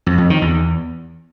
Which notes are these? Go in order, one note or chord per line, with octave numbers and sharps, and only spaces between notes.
F2
F2
D#3
E2